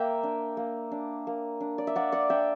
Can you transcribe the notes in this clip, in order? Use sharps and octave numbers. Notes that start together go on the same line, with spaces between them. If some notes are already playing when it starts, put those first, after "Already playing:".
Already playing: A#3 E5 G5
D4
A#3
D4
A#3
D4
D5
E5
A#3 D5 F#5
D5 F#5
D4 E5 G5